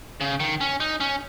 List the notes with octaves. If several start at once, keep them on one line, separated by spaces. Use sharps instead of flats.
C#3
D#3
C#4
D#4
C#4